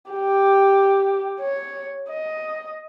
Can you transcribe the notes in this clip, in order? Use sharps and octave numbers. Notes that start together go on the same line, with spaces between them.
G4
C#5
D#5